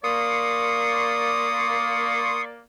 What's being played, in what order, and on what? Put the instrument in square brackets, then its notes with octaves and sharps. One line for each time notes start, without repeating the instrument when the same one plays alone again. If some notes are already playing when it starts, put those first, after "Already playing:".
[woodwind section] A#3 D5 [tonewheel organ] C6 C#6 [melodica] D#6